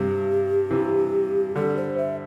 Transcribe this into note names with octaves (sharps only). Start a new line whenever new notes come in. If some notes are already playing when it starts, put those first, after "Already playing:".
Already playing: G2 C3 G4
C3 E3
D3 G3 A4
C5
E5